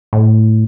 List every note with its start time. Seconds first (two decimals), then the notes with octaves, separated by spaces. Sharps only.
0.13 A2